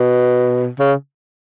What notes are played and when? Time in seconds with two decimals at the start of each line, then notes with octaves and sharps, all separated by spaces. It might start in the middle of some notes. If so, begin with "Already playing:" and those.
Already playing: B2
0.80 C#3